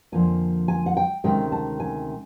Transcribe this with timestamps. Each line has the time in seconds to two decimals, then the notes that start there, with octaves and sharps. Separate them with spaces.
0.12 F2 D3 F3 A#3 G#5
0.68 G#5
0.86 F#5
0.97 G5
1.24 D2 C3 D#3 G#3 C#4 G5
1.52 A5
1.80 G#5